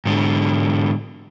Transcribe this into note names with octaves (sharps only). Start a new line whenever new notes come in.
G#2 D3